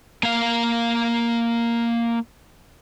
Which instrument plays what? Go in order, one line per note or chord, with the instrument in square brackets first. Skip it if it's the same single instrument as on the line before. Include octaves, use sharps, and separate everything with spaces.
[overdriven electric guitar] A#3 F5